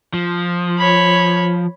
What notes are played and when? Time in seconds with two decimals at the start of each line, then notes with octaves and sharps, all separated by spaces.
0.14 F3
0.78 C#5 B5